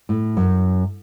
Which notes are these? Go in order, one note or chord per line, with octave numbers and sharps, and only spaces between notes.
A2
F#2